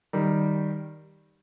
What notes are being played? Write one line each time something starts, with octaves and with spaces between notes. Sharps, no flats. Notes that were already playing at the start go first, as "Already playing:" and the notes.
D#3 G3